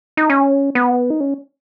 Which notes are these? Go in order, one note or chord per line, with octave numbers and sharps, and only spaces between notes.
D#4
C#4
B3
D#4
C#4